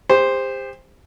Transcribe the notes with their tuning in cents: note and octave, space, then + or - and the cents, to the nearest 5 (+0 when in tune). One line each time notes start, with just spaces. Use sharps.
G4 +40 C5 +0